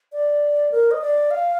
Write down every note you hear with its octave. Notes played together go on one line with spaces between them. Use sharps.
D5
A#4
D#5
D5
F5